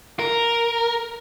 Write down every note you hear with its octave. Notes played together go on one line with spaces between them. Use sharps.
A#4